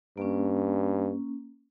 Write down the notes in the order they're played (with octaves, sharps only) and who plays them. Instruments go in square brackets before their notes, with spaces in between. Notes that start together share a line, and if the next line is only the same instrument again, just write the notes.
[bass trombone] G2 [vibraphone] A#3 C#4